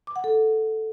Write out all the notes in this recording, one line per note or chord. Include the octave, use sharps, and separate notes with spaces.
D6
F#5
A4